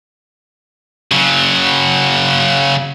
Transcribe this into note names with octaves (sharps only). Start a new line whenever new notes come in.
C#3 F#3